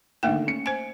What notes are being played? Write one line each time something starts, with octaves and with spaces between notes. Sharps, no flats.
D3 D#3 A3 A#3 G5
C#4 C#7
C5 G#5 D7